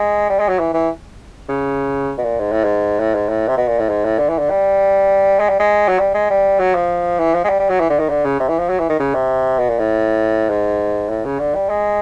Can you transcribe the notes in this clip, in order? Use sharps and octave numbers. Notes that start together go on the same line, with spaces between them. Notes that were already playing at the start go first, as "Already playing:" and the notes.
Already playing: G#3
G3
G#3
F#3
E3
E3
C#3
B2
A#2
G#2
A2
G#2
A2
G#2
A2
C3
B2
A#2
A2
G#2
A2
D3
E3
D3
G3
G#3
G3
G#3
F#3
G3
G#3
G3
F#3
F3
E3
F3
G#3
G3
G3
F#3
E3
D3
D#3
D3
C#3
C3
E3
F3
F#3
E3
D#3
C#3
C3
B2
A#2
A2
G#2
A2
C#3
D3
G3
G#3